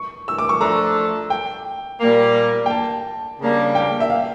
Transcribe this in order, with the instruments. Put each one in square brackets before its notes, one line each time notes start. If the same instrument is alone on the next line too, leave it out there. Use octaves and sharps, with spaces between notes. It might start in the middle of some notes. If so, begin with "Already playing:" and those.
Already playing: [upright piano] C#6
E6
D6
C#6
[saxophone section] F3 A3 D4 A4 [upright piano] A#5
[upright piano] G5
[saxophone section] A#2 G3 A#3
[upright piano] G5
A5
[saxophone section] C#3 G3 A#3 D4
[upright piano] G5
E5
F5